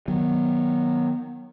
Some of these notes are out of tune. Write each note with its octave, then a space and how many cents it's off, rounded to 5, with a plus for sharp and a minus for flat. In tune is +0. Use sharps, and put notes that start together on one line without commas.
D#3 +0 F#3 +0 B3 -20